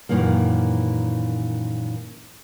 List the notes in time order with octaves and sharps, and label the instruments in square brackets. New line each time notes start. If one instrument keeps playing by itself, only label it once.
[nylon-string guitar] F#2 A#2 D#3 E3 A#3